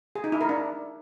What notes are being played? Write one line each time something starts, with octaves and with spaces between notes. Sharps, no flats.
G#4
D#4
E4
A#4
D4